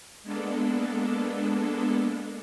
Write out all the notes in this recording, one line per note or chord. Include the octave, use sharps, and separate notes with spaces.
G#3 A#3 B3 D4 A4